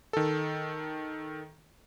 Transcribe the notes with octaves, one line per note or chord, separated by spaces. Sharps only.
D#3 A4